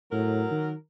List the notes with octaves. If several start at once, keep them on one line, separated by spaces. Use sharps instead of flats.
A2 F#3 A#4
D#3